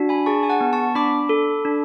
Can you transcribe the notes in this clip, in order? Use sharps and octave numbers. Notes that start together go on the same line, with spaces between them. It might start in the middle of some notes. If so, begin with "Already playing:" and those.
Already playing: D4 F#4
G#5 B5
G#4 A5 C#6
G#5
F#5 A5
B3
A5 C#6
D4 B5 D6
A4
D4